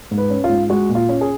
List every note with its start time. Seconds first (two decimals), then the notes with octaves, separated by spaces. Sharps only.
0.11 G#2
0.18 B4
0.30 C#4
0.44 F4
0.49 G#2
0.70 G#3 F#4
0.89 A#2
0.95 F4
1.09 C#4
1.21 G#4